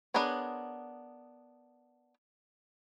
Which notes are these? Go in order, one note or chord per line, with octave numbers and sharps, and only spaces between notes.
B3 D4 G#4 A#4 C#5